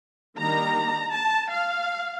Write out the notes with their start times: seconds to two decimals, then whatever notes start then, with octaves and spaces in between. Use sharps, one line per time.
0.37 D#3 G3 A#3 D4 A#5
1.13 A5
1.51 F5